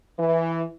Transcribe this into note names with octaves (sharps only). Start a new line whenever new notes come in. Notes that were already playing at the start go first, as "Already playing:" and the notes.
E3